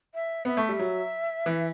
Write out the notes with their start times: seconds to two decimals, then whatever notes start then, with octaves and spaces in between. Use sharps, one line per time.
0.14 E5
0.45 B3 E5
0.57 A3
0.69 G3
0.79 F#3
1.46 E3